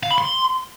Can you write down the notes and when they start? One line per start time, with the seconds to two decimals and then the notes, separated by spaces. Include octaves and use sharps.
0.03 F5
0.10 B5
0.18 C6